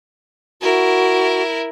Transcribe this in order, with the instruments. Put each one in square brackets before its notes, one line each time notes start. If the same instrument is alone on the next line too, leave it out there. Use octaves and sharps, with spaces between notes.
[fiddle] E4 A#4 [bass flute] F#4